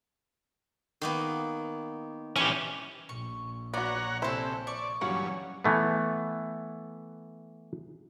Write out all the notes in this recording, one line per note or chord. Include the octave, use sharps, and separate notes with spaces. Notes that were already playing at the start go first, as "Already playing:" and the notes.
D#3 A#3 B3
E3 C#4 G4
A#1 C#6
B3 F#4 C#5 D5 F#5 A#5
C3 C#4 E4 A4 C5
D5 C#6
G2 E3 F#3 A#3 C#4 F#4 F#5
E3 A3 B3